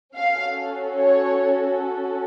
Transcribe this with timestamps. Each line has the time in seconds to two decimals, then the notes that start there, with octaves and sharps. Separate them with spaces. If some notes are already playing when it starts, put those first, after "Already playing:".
0.15 C#4 F#4 A4 F5
0.94 C#5